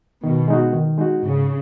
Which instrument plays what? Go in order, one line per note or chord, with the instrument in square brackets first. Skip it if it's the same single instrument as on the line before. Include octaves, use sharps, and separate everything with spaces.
[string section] B2 [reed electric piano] D#3
[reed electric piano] G#3 D#4 F#4
D#3
G#3 D#4 F#4
[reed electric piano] G#2 [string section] C#3